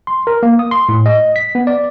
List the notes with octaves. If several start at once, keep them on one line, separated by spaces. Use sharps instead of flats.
C6
A#4
A#3
D#6
C6
A2
D#5
B6
B3
D5